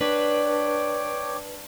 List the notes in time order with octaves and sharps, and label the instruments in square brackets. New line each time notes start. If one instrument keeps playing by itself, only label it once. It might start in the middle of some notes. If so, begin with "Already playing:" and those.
[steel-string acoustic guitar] D4 [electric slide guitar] B4 [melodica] C#5 G5 D6